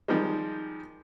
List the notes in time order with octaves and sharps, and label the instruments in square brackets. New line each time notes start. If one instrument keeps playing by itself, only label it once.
[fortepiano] D#3 F3 G3 G#3